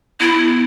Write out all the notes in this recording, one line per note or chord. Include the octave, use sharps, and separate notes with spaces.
B3 E4